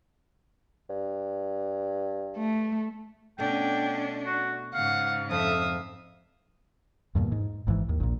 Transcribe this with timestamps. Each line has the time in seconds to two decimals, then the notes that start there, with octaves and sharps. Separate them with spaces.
0.89 G2
2.37 A3
3.38 B2 A3 C#4 D4 G5
4.26 F#4
4.74 G#2 C#3 F5 F#5
5.31 F2 E5 F5 D#6
7.15 E2 G2 A#2
7.32 G#2
7.67 G#1 G#2 B2 E3
7.89 D#2
8.00 A#1 A#2